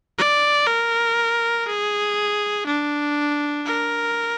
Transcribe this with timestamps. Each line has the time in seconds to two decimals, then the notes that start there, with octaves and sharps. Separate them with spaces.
0.18 D5
0.67 A#4
1.66 G#4
2.66 D4
3.65 A#4